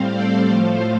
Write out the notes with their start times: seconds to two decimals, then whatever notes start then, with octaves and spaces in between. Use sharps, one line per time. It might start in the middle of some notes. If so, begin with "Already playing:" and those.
Already playing: A2 G3 C4 C5 F5
0.11 A4 D5
0.46 A2 F3 A3 C5 F5